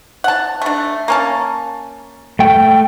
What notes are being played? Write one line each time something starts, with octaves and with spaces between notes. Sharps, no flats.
F#5 A5
A3 D4
A#3 C#4 A5
A3 G5